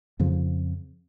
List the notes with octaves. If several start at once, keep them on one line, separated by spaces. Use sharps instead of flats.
F2 C#3 F3